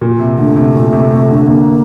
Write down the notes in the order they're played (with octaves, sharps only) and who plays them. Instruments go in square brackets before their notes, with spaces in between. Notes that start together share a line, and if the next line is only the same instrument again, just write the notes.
[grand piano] A#2
C3
[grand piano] D3 [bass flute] A3
[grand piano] C3
A#2
C3
C3
D3
[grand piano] D3 [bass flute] A#3